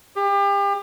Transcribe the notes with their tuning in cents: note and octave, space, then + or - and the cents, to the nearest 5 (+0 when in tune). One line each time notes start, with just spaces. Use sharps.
G4 +35